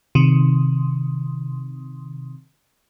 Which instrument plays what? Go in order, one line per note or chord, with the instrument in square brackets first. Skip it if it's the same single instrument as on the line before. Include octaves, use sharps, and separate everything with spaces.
[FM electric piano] C3 D#3